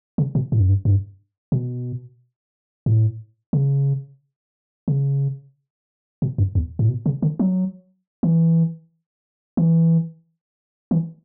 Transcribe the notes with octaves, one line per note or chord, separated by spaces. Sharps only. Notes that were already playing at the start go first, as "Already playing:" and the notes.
C#3
B2
A2
F#2
G2
G2
B2
A2
C#3
C#3
B2
F#2
E2
A2
B2
C#3
D3
F#3
E3
E3
E3